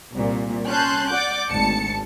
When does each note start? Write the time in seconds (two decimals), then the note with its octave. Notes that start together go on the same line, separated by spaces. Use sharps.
0.12 C2 A#2
0.66 C#4 A5 C6 F#6 G6
1.11 D5 F#5 D6 G6
1.48 G#1 D2 A5 C#7